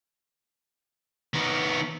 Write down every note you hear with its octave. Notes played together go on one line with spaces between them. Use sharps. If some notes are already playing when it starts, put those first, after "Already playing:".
D#3 B3